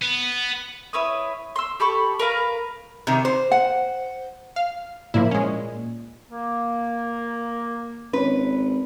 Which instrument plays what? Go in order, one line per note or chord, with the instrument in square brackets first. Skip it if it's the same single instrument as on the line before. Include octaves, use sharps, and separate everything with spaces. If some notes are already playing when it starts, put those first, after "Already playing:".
[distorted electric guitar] B3
[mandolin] E4 B4 C#5 D#6
C6 E6
G4 A4 B5 C#6
A#4 B4 F5 A#5
[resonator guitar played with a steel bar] C3 D#3
C5
[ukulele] F#5
[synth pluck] F5
[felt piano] A#2 [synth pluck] F3 A#3 E4
[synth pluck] G#3 C#4
[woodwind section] A#3
[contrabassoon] G#1 [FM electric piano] C#4 C#5 [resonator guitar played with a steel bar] B4